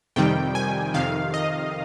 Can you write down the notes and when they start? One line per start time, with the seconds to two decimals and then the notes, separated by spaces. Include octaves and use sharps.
0.16 F2 C3 D#3 G3 G5
0.55 G#5
0.94 F2 C3 D#3 F5
1.34 D#5